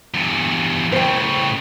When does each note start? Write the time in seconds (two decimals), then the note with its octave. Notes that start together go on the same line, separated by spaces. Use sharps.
0.14 E2 G2
0.92 A2 C#3 C5 G5